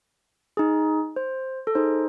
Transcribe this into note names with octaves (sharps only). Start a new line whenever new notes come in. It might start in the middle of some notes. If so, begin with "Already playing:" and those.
D#4 G#4
C5
A4
D#4 G#4 C5